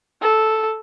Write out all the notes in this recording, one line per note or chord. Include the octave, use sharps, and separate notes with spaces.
A4